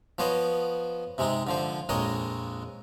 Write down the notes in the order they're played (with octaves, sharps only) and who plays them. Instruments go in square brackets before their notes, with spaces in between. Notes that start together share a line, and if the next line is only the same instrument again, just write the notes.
[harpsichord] F3 B3 C5 C#5 D#5
C3 G#3 C4 D#4
D3 F3 C5
A#1 F2 G#3 A#4 C#5 D#5